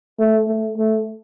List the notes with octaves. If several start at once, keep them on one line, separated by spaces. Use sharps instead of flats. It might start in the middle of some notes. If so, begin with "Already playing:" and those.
A3
A3
A3